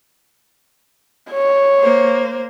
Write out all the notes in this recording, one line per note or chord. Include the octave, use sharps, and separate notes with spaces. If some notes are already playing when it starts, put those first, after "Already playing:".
C#5
A#3 C5